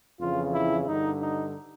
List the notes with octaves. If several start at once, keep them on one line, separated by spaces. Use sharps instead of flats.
F2 C#3 E3 F4
E4
G2 D3 D#4
D#4